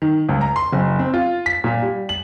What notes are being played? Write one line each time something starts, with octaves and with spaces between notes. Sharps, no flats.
D#3
C#2
A#5
C6
F#1
C4
F4
B6
A#2
G3
F#7